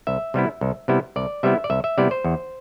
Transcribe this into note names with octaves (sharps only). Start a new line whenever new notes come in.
C2 E5
C3 G3 B3 E4
C2
C3 G3 B3 E4
C2 D5
C3 G3 B3 E4 E5
D5
C2 E5
E5
C3 G3 B3 E4 D5
C5
E2